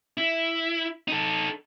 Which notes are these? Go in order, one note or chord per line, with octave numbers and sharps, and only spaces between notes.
E4
D#4 A4